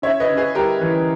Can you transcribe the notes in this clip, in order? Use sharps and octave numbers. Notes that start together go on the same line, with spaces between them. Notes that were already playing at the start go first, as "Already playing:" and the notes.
C#3 C#5 E5
B4 D#5
C#3
G#4 B4
G3 G4 A#4
E3